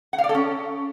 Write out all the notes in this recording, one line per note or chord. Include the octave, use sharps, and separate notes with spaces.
F#5
F5
D5
A4
C#4